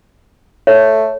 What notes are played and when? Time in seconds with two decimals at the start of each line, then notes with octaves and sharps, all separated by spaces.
0.67 A3 C#5